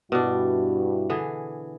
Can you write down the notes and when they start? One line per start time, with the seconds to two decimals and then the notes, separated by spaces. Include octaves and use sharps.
0.12 G2 B2 D4 E4 F#4
1.10 D3 E3 G#4